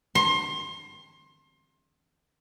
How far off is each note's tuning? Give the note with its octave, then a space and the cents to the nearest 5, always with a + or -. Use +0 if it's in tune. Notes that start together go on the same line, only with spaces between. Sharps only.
C6 +30